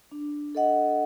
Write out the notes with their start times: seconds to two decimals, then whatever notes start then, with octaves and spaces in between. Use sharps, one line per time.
0.12 D4
0.55 A4 D#5 F#5